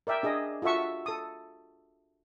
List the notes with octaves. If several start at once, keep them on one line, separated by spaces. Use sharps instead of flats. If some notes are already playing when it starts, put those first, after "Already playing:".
A#4 D5 E5 G5
D4 G#4 D#5
F4 F#4 A4 E5 C#6
A4 D#6